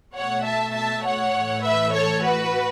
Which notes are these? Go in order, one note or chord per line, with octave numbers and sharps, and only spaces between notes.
B2 A3 C#5 F#5
E5 A5
E5 A5
C#5 F#5
A2 E3 A3
B4 E5
A4 C#5
F#4 B4